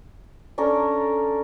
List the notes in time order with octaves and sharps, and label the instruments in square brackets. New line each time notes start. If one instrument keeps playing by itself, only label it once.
[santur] C#4 D4 A4 A#4